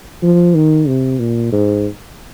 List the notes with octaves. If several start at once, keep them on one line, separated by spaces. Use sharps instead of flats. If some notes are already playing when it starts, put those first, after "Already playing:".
F3
D#3
C3
A#2
G#2